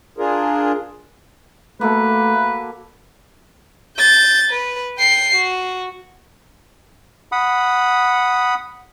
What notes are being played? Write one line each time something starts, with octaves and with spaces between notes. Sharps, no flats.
D4 F4 G#4 A#4
A3 A#3 F#4 A4 B4
G6 A6
B4
G5 C7
F#4
F#5 B5 D#6